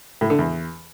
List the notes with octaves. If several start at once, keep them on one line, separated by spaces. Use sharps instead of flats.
A2
D3
E2